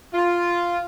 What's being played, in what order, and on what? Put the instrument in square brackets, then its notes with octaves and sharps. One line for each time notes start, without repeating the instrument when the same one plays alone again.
[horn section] F4